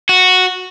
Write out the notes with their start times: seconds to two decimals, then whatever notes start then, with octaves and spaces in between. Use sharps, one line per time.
0.09 F#4